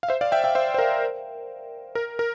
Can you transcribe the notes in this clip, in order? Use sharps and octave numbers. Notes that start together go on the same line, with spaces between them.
F5
C5 E5
D5 F5
E5 G5
E5 G5
C5 E5
C5
A#4
A#4
A#4